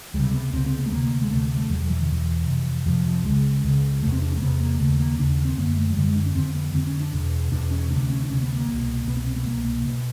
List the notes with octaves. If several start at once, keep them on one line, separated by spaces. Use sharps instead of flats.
C#2 C3 G3
B3
C#2 C3 C4
C4
B3
A3
D2 C3 A#3
G#3
D2 C3 A3
A3
E2 B2 F#3
E3
D#3
E2 B2 E3
F2 C3
F2 C3 F3
F3
C#2 C#3 G#3
C#2 C#3
E2 C3 A3
C4
D4
C#4
A#3
E2 C3 B3
A#3
D#2 C#3 A3
A#3
D#2 C#3 D4
C4
F#2 D3 A#3
A3
F#3
F#2 D3 G3
G#3
D4
C#4
F2 D3 C4
B3
F2 D3 C4
C#4
D4
E2 B2
E2 B2 D4
C#4
D2 C3 D4
C#4
D4
D2 C3 C#4
B3
A#3
C2 B2
C2 B2 B3
B3
C4
B3
C2 B2 A#3
A#3
B2